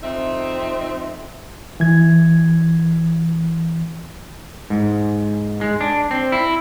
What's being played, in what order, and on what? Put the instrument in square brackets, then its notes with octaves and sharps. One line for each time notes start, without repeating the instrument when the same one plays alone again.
[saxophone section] F2 C4 D#4 E5
[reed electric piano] E3 G#6
[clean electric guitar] G#2
G#3
D4
C4
E4